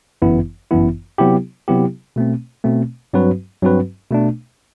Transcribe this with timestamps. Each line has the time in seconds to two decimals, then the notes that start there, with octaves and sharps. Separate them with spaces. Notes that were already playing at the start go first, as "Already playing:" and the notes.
0.22 G1 F#2 E3 B3 E4
0.71 G1 F#2 E3 B3 E4
1.18 C3 F#3 B3 E4 G4
1.68 C3 F#3 B3 E4 G4
2.16 B2 A3 C4
2.64 B2 A3 C4
3.13 G2 F#3 C4 F#4 B4
3.62 G2 F#3 C4 F#4 B4
4.11 B2 A3 D4